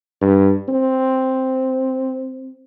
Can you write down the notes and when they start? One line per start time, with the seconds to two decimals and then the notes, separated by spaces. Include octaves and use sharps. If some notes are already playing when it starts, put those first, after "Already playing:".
0.21 G2
0.68 C4